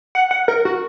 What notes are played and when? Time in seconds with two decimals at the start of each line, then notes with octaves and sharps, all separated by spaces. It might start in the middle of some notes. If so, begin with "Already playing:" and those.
0.15 F#5
0.31 F#5
0.48 A#4
0.65 F#4